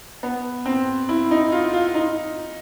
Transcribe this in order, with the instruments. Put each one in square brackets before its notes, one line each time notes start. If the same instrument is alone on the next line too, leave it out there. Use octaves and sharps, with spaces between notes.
[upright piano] B3
C4
E4
D#4
F4
F4
D#4